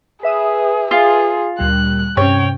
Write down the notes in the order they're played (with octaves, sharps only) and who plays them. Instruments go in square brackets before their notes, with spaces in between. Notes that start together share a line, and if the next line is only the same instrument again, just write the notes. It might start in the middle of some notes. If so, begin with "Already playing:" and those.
[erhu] G#4 [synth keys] B4 E5 D#6
[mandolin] F4 [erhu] G#4
[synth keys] D2 A#2 G3 [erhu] F#6
[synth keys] G2 C3 C#4 [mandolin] C#5 [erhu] G5